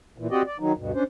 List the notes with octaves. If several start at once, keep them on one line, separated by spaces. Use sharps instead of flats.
A#2 E3
C4 F#4 G4 D5 D#5
D5
D#3 F#3 D#4
D2 G2 B2
C#4 D4 C5